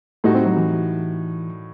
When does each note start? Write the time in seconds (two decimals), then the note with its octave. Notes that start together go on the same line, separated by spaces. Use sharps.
0.24 A2 G3 A3 D#4 F#4
0.35 C4
0.46 F#3
0.57 E3